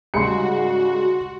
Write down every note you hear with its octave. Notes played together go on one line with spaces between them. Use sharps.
G#2 C#3 G3 F#4 C6 C#7